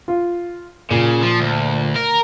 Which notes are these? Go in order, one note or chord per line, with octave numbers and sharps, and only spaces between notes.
F4
A#2 C#3
F3
D2
A#4